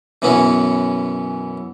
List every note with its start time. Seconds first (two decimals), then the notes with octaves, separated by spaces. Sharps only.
0.22 F#2 B2 E3 B3 C#4